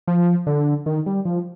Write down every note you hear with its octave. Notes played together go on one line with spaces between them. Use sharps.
F3
D3
D#3
G3
F3